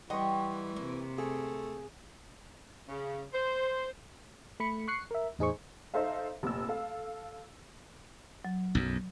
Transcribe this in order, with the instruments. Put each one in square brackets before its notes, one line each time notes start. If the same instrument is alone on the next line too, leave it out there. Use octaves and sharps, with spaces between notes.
[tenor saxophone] E3 [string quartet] G3 [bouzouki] D#5 F#5 G5 [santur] C6 C#6
[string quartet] C3 [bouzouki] A#3
[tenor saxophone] A3 [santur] G#4
[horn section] C#3
C5
[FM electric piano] A3 B5 C#7
C#6 F#6 C7 C#7
A#4 E5
E2 A2 D#4 G#4 C5 C#6
[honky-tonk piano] D#4 A4 C5 E5 F5
F1 A#2 E6
A4 F5
[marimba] F#3
[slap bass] B1 F#2